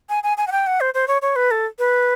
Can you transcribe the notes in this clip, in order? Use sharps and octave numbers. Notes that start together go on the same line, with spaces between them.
G#5
G#5
G#5
F#5
G5
F#5
C5
C5
C#5
C#5
B4
A4
B4